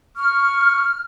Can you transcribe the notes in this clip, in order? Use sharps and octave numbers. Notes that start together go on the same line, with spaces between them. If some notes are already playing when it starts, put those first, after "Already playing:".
C#6 F6